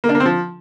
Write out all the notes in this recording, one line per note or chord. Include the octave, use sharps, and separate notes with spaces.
A#3
D4
A#3
C4
F3